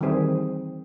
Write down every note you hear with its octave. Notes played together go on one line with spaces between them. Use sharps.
D#3 E3 G3 C4 G#4 C5